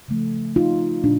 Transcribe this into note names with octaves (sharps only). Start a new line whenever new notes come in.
C#3 F3 A3
D#4 F4
A#2 D4